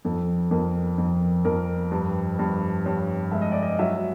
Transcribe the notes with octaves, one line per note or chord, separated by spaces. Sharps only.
F2 A4
F2 A#4
F2
F2 A#4
G2 B4
G2
G2 C#5
G#3 E5
D#5
D5
D#5
F#3 E5